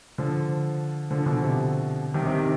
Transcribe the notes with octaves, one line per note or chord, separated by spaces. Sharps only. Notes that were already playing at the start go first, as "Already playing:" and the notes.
D3 F3
D3 F3
B2 D3
C3
C3 D#3
C3 D#3
C3